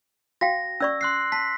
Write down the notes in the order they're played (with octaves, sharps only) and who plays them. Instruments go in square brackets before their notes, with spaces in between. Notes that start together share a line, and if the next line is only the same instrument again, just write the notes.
[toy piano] F#4 F5 G5 [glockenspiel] A#6
[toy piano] C#4 D5 C#6 [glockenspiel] E6
[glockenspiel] C6 F#6 C7
[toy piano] A5 [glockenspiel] B6